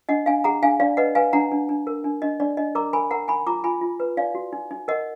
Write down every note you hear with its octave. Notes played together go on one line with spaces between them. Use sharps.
D4 D#5 F#5
D4 F5 G#5
G#4 F#5 A#5
D4 F5 G#5
D4 D5 F5
B4 D#5 F#5
B4 F5 G#5
D4 F#5 A#5
D4
D4
A#4
D4
D4 D#5
D4 D5
D4 D#5
A#4 A#5 D6
A#4 G#5 B5
A#4 F#5 A#5
D#4 G#5 B5
F4 A#5 D6
F4 G#5 B5
F4
B4
D#4 D5 F5
F#4
D#4
D#4
A#4 D#5 F#5